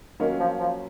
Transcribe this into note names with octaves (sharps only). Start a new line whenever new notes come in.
D#3 F#3 A#3 C#4 F4
F3
F3